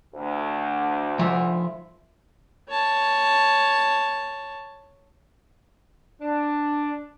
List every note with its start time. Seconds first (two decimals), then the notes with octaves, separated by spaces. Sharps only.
0.14 D2
1.19 F3 E5
2.69 C#5 A5
6.21 D4